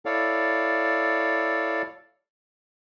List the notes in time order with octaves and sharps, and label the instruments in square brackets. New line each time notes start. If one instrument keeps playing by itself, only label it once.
[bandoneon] E4 A4 C#5 D5 F5